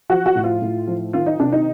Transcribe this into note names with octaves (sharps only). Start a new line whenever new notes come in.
F3 F#4
F#4
A2
F4
A2
F3
D#3 F4
D#4
C3 D4
D#4